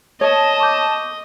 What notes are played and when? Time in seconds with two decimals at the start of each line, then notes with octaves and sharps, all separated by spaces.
0.21 C#5 D#5 A5
0.60 C#6 D6 G6